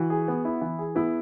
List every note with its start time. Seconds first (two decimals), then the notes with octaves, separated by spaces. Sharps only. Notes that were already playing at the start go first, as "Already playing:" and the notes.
Already playing: E3 F#4
0.10 G#4
0.28 B3
0.45 E4
0.61 E3
0.79 G#4
0.95 B3 E4